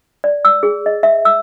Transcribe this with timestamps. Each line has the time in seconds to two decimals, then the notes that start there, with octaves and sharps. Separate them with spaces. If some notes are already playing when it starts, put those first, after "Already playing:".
0.24 D5
0.45 E6
0.63 G#4
0.86 D#5
1.03 E5
1.25 E6